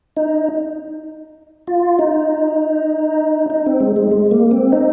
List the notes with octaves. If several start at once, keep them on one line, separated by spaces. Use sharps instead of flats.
D#4
F4
D#4
D#4
C4
G#3
G#3
G#3
A#3
C4
D#4